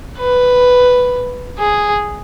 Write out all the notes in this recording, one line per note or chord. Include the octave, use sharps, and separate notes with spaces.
B4
G#4